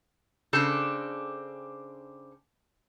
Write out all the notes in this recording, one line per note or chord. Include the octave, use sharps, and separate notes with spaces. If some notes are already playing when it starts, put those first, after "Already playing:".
C#3 C4 D4 A4